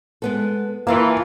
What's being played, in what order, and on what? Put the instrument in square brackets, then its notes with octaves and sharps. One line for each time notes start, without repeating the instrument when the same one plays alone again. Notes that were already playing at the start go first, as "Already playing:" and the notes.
[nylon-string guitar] G#3 B3 A4
[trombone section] E3 [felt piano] A#3 [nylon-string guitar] F4 F5 A5